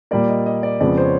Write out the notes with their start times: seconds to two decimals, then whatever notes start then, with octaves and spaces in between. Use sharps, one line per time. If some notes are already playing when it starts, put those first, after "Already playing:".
0.11 A#2 G3 A#3 D5
0.29 D#5
0.46 D#5
0.63 D5
0.80 F2 C#3 F3 G#3 B3 D5
0.98 C5
1.04 C#5